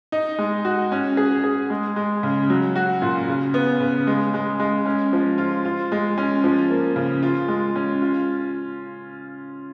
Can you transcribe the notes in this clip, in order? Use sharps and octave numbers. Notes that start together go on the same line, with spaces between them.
D#4
G#3
F#4
C#4
G#4
G#4
G#3
G#3
C#3
F#3
F#4
A#2
C#3
B3
C#3
G#3
G#3
G#3
C#4
F3
F4
F4
G#3
C#4
F3
A#3
C#3
F4
G#3
C#4
F4